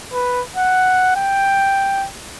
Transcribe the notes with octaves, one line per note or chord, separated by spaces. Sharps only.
B4
F#5
G5